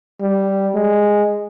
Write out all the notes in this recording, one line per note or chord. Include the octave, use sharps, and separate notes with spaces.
G3
G#3